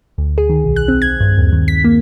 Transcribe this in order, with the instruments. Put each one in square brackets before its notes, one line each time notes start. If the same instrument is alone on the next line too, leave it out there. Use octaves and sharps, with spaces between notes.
[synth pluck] D2
G#4
D#3
B1
F#6
C4
G#6
G2
D#2
D#3
B6
A#3